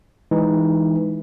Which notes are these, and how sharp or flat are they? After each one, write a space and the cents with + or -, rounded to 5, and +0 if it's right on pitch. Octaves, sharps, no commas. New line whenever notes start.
E3 +0 G#3 +0 D#4 +0